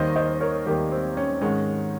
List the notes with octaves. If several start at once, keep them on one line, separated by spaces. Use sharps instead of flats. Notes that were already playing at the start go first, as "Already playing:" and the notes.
Already playing: D#2 D#3 G3 A#3 C5 D#5
C5 D#5
A#4 C#5
D#2 D#3 G3 A#3 G4 A#4
C4
C#4
G#2 D#3 G#3 C#4